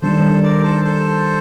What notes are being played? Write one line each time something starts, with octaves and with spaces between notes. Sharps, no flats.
D#3 G3 D4 A4 C5
A#4 D5
A4 C5
A4 C5